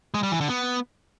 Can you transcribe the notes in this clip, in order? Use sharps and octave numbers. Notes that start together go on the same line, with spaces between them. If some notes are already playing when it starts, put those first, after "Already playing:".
G#3
G3
E3
D3
B3